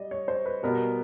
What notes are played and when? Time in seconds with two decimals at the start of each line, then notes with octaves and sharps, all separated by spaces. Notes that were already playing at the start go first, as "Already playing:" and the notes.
Already playing: G3 D5 D#5
0.11 C#5
0.28 C5
0.46 B4
0.63 B2 G3 B3 A#4